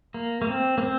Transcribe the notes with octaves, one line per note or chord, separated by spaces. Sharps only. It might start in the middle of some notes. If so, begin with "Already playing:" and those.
A#3
A#3
C4
A#3
C4